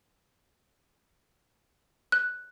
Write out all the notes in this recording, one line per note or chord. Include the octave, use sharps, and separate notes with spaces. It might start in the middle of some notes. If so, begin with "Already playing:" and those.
F#6